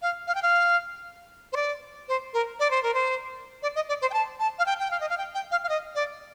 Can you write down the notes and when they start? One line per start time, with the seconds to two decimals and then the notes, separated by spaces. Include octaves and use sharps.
0.02 F5
0.27 F5
0.35 G5
0.42 F5
1.53 C5
1.56 D5
2.08 C5
2.33 A#4
2.59 D5
2.71 C5
2.83 A#4
2.94 C5
3.63 D5
3.75 D#5
3.89 D5
4.01 C5
4.10 G5
4.13 A5
4.39 A5
4.59 F5
4.66 G5
4.80 G5
4.91 F5
5.00 D#5
5.09 F5
5.18 G5
5.34 G5
5.51 F5
5.63 F5
5.69 D#5
5.95 D5